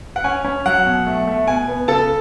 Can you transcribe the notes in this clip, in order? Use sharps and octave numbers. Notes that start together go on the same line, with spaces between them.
F#5
C#4 G#5
C#4
F#3 F#5
B2
A3
A3
B2 G#5
B3
C#3 A4 A5